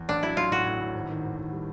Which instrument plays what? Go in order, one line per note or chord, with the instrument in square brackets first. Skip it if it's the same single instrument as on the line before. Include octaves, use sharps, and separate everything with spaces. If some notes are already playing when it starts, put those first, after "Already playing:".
Already playing: [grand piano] E2
[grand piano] A1 [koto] D4
[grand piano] F#3 [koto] E4
[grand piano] F#3 [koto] F4
[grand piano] A2 [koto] F#4
[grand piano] A2
A2
G#1
D#3
G#1
G#1
G3